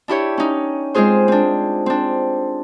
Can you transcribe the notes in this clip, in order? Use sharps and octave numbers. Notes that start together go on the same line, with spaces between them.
D4 E4 G4 C#5
C#4 D#4
G#3 C4 F4 G#4 C5
C4 D4
C4 D4